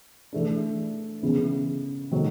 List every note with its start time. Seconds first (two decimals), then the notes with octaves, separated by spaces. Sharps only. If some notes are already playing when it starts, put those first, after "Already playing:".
0.33 E3 A3 D4
1.22 C#3 E3 G#3 B3
2.12 D#3 F#3 A3